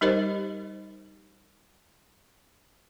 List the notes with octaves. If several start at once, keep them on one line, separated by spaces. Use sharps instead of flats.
G3 D#4 G4 A#4 C5 D#5